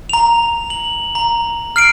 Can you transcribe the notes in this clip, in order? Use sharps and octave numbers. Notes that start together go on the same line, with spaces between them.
A#5 F7
F#7
A#5
F6 C7 D7